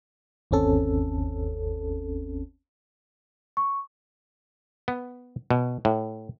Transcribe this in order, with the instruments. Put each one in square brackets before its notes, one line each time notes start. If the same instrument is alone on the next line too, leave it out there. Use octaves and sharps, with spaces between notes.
[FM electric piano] G1 D#2 C4 C#4 A4
[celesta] C#6
[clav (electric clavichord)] B3
B2
A2